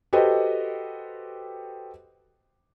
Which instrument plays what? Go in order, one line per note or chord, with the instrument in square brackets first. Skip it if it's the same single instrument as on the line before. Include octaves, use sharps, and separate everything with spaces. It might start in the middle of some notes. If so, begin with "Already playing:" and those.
[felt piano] F#4 G4 A4 B4 C5 D#5